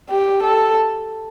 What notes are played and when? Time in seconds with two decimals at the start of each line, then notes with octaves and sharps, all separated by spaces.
0.11 G4
0.43 A4